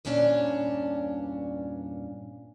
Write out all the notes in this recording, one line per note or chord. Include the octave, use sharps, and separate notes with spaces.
E2 G2 A#2 C#4 D4